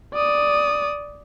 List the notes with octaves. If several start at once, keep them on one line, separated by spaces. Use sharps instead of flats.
D5 D#6